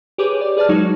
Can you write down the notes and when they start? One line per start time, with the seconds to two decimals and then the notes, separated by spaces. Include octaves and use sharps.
0.18 G4 G#4 B4 C#5 D6 G6
0.41 D5
0.57 G#4 B4 D5 A5 F6
0.69 F#3 G#3 D#4 F#4